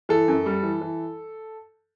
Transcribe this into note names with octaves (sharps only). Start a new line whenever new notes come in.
E3 A4
F#2
G3
E3
E3